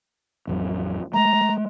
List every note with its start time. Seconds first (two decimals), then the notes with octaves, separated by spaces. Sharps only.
0.47 A1 F2 F#3
1.14 G#3 A3 A#5